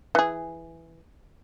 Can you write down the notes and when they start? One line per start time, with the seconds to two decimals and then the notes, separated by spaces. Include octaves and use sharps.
0.15 E3 G#4